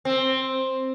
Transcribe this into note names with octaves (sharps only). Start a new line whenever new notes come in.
C4